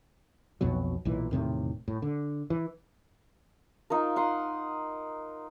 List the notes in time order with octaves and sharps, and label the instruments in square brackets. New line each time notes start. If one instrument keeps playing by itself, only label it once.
[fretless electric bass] B1 F2 B2 F#3
B1 A#2 E3
E1 A2 C3 D#3
A2
D3
E3
[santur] D#4 F4 A#4
D#4 F#5 C6